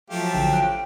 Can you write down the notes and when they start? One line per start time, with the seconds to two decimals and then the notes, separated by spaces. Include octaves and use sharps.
0.10 F3 F#3 A3 G4 F5
0.33 A1 D3 G5 E7
0.53 F#6